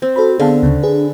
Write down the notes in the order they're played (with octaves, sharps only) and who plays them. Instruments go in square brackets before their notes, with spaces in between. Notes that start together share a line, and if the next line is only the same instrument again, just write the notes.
[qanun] C4
[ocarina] F#4 [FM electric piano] A4 C5 B5
[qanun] D3 [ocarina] B3 [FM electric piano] G#4 F5 A5
[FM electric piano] D2 C#3
[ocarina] D4 [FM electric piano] G#4 B4